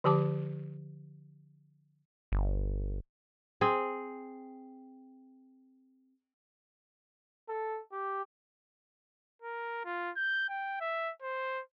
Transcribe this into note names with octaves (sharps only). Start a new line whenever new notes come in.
D3 F3 G4 A5 D6
G1
C4 G#4
A4
G4
A#4
F4
G6
G5
E5
C5